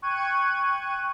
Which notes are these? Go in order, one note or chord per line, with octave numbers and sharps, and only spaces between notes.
G5 C#6 F#6 G#6 D#7